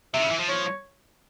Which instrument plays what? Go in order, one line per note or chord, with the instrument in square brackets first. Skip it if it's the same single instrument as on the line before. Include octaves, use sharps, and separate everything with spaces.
[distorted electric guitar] C3 [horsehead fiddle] E5
[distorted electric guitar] C#3
E3
F3
[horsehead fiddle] C#5